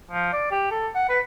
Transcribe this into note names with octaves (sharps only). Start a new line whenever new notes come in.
F3
D5
G4
A4
F#5
B4